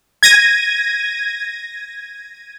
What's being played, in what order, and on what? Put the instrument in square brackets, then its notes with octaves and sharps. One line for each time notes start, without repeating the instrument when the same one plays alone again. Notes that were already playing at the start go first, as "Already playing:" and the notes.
[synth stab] G#6 A#6 D#7